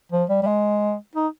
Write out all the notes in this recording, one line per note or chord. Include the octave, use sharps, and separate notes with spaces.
F3
G3
G3
G#3
D#4